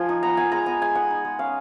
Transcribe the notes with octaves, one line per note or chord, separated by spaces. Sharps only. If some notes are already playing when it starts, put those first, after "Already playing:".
Already playing: F3 F4 G#5
D#4
B3 A#5
B3 G#5
G#3 A#5
B3 G#5
G#3 G#5
D#4 F#5
D#4
G#3
C#4 F5